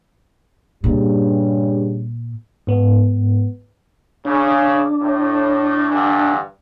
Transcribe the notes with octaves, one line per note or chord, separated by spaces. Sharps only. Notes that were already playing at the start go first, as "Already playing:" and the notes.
G2 A#2 C#3 G3
G#2 B3
C#3 D4
A2
G2 D3 E3